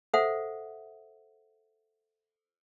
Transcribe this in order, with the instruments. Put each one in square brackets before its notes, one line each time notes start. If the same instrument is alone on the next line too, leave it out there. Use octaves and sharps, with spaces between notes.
[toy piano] A4 C5 E5 F#5